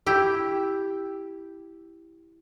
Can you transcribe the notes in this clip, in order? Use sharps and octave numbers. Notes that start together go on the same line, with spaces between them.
E4 G4 G5